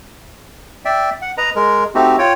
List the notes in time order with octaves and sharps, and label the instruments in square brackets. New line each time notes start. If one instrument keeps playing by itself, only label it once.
[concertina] D5 E5 G5
F#5
B4 D#5 A#5
G#3 A#4
A3 C4 D#4 F#4 G4
F4 C#5 G5